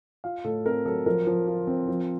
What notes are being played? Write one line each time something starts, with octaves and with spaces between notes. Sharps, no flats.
F4 F5
A2 A4
C4 A#4
F#3 A4
F3 A#4
F3
F4
C4
F3